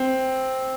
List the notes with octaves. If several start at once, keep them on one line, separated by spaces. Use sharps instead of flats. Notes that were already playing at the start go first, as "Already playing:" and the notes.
Already playing: C4